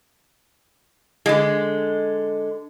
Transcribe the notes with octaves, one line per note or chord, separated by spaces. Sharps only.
D3 G#3